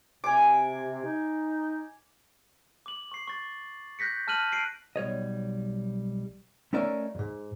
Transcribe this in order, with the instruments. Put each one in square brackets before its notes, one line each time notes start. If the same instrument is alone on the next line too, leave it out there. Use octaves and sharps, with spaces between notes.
[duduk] C3 [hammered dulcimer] G#5 D6
[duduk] D#4
[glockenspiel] D6 F#7
C#6 C7
C#6 A6
F#6 G6 A#6 B6 C#7
A5 F6 F#6 D#7 F#7
C7 D7 D#7
[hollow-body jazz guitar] B1 G3 C#5 D#5
A3 C#4 D#4 A#4 D5 E5
F2 G#2